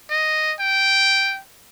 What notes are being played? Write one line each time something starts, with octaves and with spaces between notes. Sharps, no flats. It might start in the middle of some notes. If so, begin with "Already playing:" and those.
D#5
G5